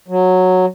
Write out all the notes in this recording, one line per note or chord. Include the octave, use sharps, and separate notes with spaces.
F#3